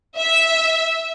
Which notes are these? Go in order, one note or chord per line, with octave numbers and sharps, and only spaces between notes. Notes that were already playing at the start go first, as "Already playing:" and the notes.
E5